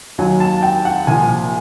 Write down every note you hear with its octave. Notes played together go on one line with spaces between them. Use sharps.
D#2 D#3 F#3 G#5
A5
G5
F#5
C2 A#2 F3 G#5